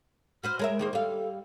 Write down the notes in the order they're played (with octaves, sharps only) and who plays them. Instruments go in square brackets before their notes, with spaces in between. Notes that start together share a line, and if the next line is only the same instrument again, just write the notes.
[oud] F#4 B4 C5 [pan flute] F6
[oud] G#3 A#4 E5 [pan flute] C#5
[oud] D#3 A#3 C5 [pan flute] G#4
[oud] G3 F5 [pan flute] A4